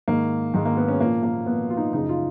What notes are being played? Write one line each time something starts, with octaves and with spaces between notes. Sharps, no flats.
G#2 D#3 A#3
G#2 D#3 G#3
A#3
B3
C#4
A#2 F3 A#3
A#3
A#2 F3 B3
F4
D#4
F#2 C#3 F3 D#4
F4